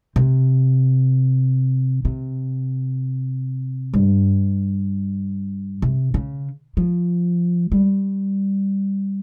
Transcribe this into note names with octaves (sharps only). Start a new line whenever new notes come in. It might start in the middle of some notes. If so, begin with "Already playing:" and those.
C3
C3
G2
C3
C#3
F3
G3